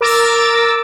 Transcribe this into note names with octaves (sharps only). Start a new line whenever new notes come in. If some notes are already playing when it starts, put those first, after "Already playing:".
A#4 D6 E6 A6